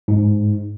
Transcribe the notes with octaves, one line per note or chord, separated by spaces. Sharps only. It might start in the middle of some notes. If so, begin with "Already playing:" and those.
G#2